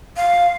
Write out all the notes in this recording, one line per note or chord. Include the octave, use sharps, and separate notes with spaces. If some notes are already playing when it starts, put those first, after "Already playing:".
F5